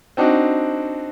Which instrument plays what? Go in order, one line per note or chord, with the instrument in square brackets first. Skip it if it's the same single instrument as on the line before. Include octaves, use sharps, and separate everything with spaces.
[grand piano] C4 D4 D#4 F#4